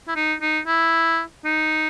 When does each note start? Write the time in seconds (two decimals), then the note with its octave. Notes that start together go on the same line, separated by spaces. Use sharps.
0.08 E4
0.16 D#4
0.41 D#4
0.67 E4
1.45 D#4